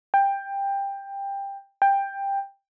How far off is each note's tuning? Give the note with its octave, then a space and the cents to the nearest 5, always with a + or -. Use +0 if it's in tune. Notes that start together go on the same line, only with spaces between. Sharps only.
G5 +15
G5 +15